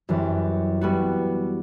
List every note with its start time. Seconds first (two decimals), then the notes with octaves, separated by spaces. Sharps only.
0.09 F#2 E3 G3 C4
0.81 G3 B3 F#4